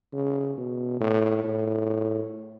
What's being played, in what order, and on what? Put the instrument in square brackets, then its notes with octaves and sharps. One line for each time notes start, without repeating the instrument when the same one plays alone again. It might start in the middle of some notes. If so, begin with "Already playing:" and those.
[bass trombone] C#3
B2
A2
A2